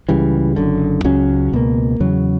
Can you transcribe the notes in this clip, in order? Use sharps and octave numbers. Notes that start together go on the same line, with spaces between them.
C#2 C#3 E3 G3
F#1 F#2 D3
C#2 C#3 F#3 C#4
C#2 B2 A#3
E2 C#3 F#3